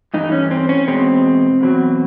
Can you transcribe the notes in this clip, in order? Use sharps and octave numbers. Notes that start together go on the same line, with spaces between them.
G2 E3 A3 D#4
C#4
C4
C#4
E2 B2 G#3 C4
E2 B2 F#3